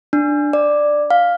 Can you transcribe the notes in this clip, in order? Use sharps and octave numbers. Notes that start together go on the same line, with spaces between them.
D4
D5
F5